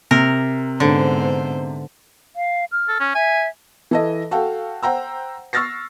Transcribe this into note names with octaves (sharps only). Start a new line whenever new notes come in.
C3 A#4
G#2 D3 B3 C5
F5
F6
A4
C#4
E5 G#5
E3 A4 D#5
F#4 A4 F5 G5
C5 F#5 G5 A#5 E6
C#6 E6 F6 A6 A#6 C7